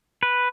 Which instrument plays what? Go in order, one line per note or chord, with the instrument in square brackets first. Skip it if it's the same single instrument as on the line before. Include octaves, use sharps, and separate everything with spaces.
[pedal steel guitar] B4